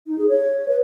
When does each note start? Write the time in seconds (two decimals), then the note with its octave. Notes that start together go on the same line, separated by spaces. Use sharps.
0.06 D#4
0.18 G#4
0.29 C#5
0.68 B4